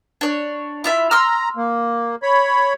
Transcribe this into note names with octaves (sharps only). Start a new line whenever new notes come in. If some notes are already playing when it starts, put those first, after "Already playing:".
D4 C#5
E4 F4 E5
A#5 C6 E6 F6
A#3
C#5 B5